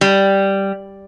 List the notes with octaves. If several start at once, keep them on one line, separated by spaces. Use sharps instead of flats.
G3